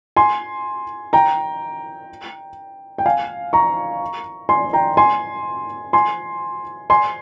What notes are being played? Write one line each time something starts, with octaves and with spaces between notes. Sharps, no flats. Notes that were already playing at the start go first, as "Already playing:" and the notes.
G#5 C6
G5 A#5
G5
F5 G#5
A#5 C#6
G#5 C6
G5 A#5
G#5 C6
G#5 C6
G#5 C6